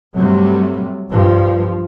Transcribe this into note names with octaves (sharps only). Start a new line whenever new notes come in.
G2 C3 F#3 G3 A3
B1 G2 F3